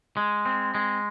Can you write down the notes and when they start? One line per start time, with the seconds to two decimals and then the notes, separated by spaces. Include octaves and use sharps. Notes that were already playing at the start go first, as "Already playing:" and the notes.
0.17 G#3
0.46 C4
0.75 G#3